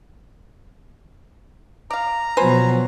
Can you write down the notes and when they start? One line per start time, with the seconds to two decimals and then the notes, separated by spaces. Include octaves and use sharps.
1.91 D5 F5 A#5
2.37 B2 F3 F#3 B4 C5 G#5